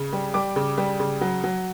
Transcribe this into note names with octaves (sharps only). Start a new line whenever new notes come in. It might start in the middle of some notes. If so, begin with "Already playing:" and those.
Already playing: C#3
G3
G3 D6
C#3
G3
C#3
F#3
F#3